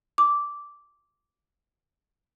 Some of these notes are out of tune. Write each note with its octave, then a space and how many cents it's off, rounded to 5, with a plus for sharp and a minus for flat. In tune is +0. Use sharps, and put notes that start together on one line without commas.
D6 -10